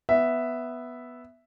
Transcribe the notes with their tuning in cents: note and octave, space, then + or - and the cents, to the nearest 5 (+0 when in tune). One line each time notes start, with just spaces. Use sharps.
B3 +0 E5 +0